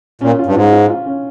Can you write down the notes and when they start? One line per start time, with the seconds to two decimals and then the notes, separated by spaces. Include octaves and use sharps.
0.21 A#2 C#4
0.39 F4
0.46 G2
0.56 G#2 F4
0.72 F4
0.90 F4
1.06 C#4